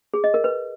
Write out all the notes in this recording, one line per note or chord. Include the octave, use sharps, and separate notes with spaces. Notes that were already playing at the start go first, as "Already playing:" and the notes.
G#4
D#5
A#4
B4